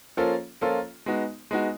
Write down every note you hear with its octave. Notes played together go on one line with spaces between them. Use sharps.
F3 A#3 C#4 F4 A4
F3 A#3 C#4 F4 A4
G#3 B3 D#4 F#4
G#3 B3 D#4 F#4